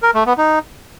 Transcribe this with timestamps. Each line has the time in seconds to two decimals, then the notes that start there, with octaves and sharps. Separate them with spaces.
0.03 A#4
0.14 A3
0.26 B3
0.38 D#4